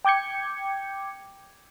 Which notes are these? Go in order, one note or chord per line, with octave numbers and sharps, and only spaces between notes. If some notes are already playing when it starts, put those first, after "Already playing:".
G5 D6 G6 G#6 C#7